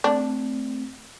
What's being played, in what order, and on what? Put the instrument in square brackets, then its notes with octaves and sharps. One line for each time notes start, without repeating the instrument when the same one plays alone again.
[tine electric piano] A3 C4 [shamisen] D4